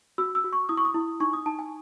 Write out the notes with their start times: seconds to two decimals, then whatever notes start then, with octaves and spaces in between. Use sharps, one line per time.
0.18 F#4 E6
0.35 E6
0.44 F#4
0.53 C#6
0.69 E4 D#6
0.77 C#6
0.85 D#6
0.94 E4
1.20 D#4 C#6
1.33 D#6
1.46 D#4 A5
1.59 G#5